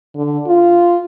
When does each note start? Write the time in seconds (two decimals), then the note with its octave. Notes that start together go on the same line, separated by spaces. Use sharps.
0.15 D3
0.47 F4